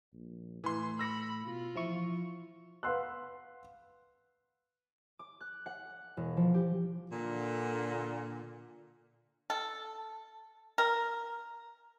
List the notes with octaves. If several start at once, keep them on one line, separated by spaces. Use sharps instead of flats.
A#1
A2 E3 C6
B5 E6 A#6 C#7
B2 F4
E3 F3 E4 C#6
B4 F5 F#5 C6 E6 F#6
D6
F#6
F#5
E1
F3
G4
A#2 D3
A4
A#4